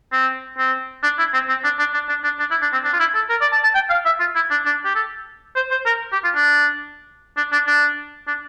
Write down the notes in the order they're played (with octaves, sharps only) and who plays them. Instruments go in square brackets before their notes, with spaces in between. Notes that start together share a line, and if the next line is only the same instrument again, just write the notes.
[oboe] C4
C4
D4
E4
C4
C4
D4
D4
D4
D4
D4
D4
E4
D4
C4
D4
F4
E4
A4
A#4
D5
A5
A5
G5
F5
E5
F4
E4
D4
D4
G4
A4
C5
C5
A#4
G4
F4
D4
D4
D4
D4
D4